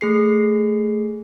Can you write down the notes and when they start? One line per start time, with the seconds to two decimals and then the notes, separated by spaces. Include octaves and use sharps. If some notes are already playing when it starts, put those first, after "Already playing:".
0.01 A3 G#4 C7